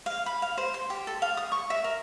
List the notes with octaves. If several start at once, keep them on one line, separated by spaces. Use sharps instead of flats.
F5
B5
F5
C5
C6
G4
A4
F5
D#6
C#6
E5
A#4